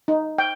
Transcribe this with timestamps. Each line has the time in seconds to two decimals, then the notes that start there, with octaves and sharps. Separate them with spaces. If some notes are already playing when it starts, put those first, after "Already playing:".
0.08 D#4
0.38 G5